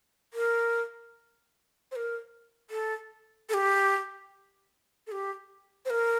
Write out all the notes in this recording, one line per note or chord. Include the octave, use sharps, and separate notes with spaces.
A#4
C5
A#4
A4
A4
G4
A4
G4
C5
A#4